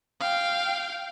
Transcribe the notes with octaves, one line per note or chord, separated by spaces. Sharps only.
F5 G5